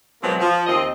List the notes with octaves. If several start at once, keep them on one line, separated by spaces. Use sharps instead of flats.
B2 F3 F#3 G#3 A#3 C4
F3
D#2 C4 D#5